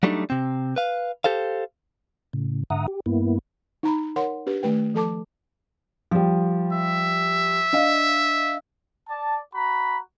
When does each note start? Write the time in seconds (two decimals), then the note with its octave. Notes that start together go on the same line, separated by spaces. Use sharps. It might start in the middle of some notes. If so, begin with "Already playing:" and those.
0.03 F#3 G3 A3 D4 D#4
0.30 C3 C4
0.76 B4 F5
1.24 G4 A4 C5 F5
2.33 A2 C#3
2.70 G#2 D3 E5 F#5 A#5 D#6
2.88 G4
3.06 G2 A#3 B3 E4
3.83 D#4 A#5 B5
4.16 A#4 C#5 F#5 C6
4.46 D4 G4 B4
4.63 D#3 A3 B4 G5
4.94 F3 A4 A5 D6
6.11 F3 G3
6.73 E5
7.73 D4 D#5 F5
9.09 D5 A5
9.55 F#4 A#5 B5